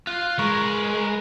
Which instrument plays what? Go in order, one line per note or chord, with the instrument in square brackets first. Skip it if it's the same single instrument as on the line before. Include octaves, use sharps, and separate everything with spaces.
[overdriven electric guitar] F4 [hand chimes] F#6
[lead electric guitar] G#3 [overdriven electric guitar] A#4 B4 [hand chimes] C#6